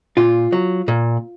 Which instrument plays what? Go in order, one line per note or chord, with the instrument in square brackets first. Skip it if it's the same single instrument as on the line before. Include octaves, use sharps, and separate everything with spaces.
[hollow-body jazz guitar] A#2 F4
F#3
A#2